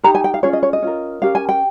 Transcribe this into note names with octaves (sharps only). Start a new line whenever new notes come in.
D#4 G4 A#4 A#5
G#5
G5
F5
C#4 F4 G#4 C#5
D#5
C#5
D#5
C#4 F4 A#4
C#4 G4 A#4 F5
G#5
G5